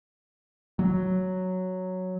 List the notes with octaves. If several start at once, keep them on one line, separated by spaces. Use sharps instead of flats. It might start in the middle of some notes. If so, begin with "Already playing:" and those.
F#3